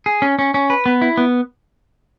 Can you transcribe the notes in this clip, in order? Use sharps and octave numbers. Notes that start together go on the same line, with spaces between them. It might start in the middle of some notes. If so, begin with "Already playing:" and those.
G#4
C#4
C#4
C#4
B4
B3
E4
B3